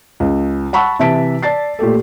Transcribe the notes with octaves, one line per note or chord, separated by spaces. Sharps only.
C#2
F#5 A5 B5 C#6 E6
C3 E3 E5 A5 B6 D7
D5 A5 A6 C7
A#2 A3 G4 A4